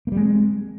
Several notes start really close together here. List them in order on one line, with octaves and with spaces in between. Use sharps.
A#3 G3 G#3 C4